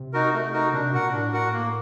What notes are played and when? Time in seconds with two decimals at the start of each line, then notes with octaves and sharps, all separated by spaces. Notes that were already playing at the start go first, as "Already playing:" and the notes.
Already playing: C3
0.13 D#4 F#4 A#4
0.33 A3
0.53 D#4 F#4 A#4
0.73 C3 D4
0.93 A#2 F#4 A#4 F#5
1.12 A2 D4
1.32 F#4 A#4 F#5
1.53 A#3